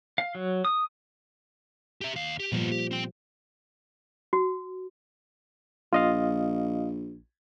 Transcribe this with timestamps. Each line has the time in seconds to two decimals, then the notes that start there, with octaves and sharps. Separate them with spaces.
0.18 F5
0.35 F#3
0.65 D#6
2.01 G4 E5
2.15 D#2 F5
2.40 G4
2.52 A#2 F3 G3 B3 F4
2.71 G4
2.91 C4 G5
4.33 F#4
5.93 A#1 F4 D#5 F5